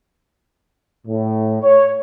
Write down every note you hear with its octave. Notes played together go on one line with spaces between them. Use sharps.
A2
C#5